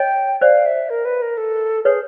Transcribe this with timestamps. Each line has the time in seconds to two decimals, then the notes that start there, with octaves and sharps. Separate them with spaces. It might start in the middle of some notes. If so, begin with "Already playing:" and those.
Already playing: C#5 D#5 G5
0.41 C5 D5 F5
0.66 E5
0.90 A#4
1.05 B4
1.22 A#4
1.37 A4
1.85 G#4 B4 C#5